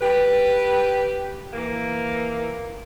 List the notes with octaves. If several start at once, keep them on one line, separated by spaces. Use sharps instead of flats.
G4 B4
E3 A#3